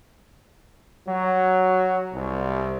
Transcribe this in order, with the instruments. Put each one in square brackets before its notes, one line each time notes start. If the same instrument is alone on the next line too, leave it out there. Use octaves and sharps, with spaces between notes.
[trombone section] F#3
C2